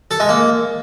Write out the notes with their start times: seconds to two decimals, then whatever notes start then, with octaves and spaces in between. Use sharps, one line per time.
0.11 A4
0.20 G#3
0.29 A#3